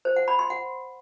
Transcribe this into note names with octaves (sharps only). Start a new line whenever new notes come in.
C5
F#5
B5
C6
F#5